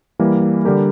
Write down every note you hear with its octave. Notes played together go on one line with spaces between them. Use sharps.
E3 G3 A#3
D3 G3 D4 G4 A#4